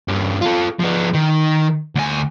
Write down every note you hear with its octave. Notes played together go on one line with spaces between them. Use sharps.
G2 C#4
F4 A4
F3 B3
D#3
D2 G#5